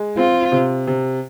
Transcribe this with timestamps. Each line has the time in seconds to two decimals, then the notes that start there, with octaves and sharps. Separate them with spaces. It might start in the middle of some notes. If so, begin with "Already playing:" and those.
Already playing: G#3
0.17 C4 F4
0.52 C3
0.87 C3